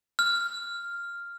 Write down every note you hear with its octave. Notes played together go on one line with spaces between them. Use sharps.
F6